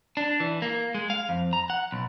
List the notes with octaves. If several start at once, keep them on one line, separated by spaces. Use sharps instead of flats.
D4
E3
A#3
G#3
F5
F2
A#5
F#5
B1